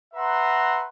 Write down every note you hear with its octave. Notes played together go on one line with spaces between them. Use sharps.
B4 E5 F#5 A#5 C6